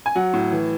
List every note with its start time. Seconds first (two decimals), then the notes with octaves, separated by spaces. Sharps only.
0.06 G#5
0.15 F#3 F#5
0.33 A2
0.52 E3